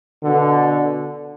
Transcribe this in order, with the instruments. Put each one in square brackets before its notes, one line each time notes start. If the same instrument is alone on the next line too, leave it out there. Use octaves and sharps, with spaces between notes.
[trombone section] B2 D3